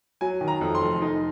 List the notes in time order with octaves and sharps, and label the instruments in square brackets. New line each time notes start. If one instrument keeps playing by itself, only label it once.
[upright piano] F#3 G#5
D#3
A#5
F2
C6
F1
D#4